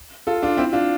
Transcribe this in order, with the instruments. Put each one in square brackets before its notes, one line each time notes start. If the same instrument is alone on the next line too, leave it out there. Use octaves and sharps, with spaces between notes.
[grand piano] F4 A4
D4 F4
C4 E4
D4 F4